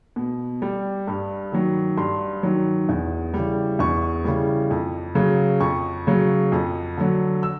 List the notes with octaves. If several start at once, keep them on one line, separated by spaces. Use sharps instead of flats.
B2
G3
G2
D#3 F#3
G2 C6
D#3 F#3
E2
C#3 E3 G3
E2 C#6
C#3 E3 G3
F2
C#3 F#3
F2 C#6
C#3 F#3
F2
D3 F#3
E6